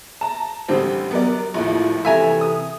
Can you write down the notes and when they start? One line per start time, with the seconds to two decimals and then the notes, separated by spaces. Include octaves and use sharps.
0.21 A5 A#5
0.69 A1 D3 G3 C4
1.11 F#3 B3 A#4 D5
1.54 A#1 D#2 A2 E4 F4
2.05 C3 E3 A4 E5 G#5 A#5
2.41 D#6